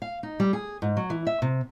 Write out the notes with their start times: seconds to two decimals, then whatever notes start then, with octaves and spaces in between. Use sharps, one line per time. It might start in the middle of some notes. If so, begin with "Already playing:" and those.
0.02 F5
0.23 D#4
0.40 G3
0.53 G#4
0.82 G#2
0.97 F#3
1.10 E3
1.27 E5
1.42 C3